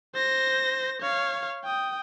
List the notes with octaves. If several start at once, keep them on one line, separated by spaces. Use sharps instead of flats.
C5 A#6
C#5 F5
G5 D#6